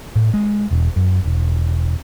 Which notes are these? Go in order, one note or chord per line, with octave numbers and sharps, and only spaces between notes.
A2
G#3
E1
F#2
E1